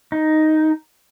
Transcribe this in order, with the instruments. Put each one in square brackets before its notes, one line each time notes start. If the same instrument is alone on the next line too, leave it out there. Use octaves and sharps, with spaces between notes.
[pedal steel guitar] D#4